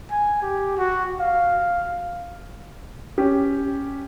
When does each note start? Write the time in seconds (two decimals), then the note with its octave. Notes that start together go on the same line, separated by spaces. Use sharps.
0.11 G#5
0.42 G4
0.77 F#4
1.21 F5
3.18 C#4 G4